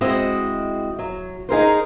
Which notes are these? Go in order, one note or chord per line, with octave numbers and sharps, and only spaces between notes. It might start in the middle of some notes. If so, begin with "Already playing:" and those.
G#3 C4 E4 F#4 D#5
F#3
D#4 G#4 A#4 C5